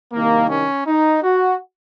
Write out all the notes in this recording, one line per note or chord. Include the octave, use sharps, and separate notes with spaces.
C2 C3 D#3 A#3
C#4
D#4
F#4